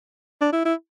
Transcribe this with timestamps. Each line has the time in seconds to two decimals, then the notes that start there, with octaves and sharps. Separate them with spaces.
0.41 D4
0.53 E4
0.65 E4